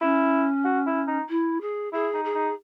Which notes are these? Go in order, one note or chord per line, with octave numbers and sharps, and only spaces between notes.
C#4 E4
F#4
E4
D#4
E4
G#4
E4 G#4
D#4
G#4
D#4